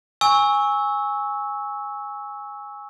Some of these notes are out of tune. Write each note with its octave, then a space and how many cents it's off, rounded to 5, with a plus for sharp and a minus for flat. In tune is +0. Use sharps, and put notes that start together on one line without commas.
G#5 -10 C#6 +0 E6 -20